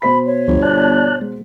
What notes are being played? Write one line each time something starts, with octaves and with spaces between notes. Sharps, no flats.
B2 C5 B5 B6
C#5
G1 D2 F3
D5 A5 F#6
G#3